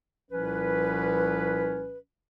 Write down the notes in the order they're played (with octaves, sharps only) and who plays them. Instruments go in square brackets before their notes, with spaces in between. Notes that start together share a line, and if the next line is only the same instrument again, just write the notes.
[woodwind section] C2 A#2 F3 C#4 B4